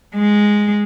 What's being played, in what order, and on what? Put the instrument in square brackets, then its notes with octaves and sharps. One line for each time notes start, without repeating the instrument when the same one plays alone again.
[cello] G#3